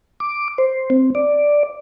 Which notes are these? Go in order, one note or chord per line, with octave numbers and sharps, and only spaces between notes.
D6
C5
C4
D5